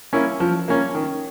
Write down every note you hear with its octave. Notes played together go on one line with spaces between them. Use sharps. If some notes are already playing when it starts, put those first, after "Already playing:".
A#3 C#4 E4
F3
A#3 C#4
D#3